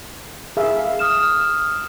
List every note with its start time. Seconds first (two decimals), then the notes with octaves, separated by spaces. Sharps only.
0.57 G#4 E5 F5
0.99 D#6 F6 E7